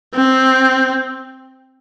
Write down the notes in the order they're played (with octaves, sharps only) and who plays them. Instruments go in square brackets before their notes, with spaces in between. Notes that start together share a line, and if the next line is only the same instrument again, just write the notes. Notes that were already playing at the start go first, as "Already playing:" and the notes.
[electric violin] C4